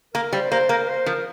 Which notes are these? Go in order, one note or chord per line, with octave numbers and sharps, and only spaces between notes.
A#3 A#4
G3 C5
A#3 C5
A#3 A#4
C5
F3 A#4